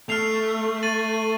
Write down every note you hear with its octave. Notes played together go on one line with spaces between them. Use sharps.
A3 F6 C7 F7
A6 D#7 F#7